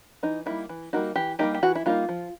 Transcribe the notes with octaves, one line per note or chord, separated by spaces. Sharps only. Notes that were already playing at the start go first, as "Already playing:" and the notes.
E3 D#4
G3 A#3 D#4 E4
E3
G3 A#3 D#4 F#4
E3 G4
G3 A#3 D#4 G4
G4
E3 F#4
E4
G3 A#3 D#4 F4
F3